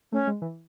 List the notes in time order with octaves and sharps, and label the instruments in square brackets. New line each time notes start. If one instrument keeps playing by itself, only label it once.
[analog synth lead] A3 [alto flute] C#4
[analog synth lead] G#3
E3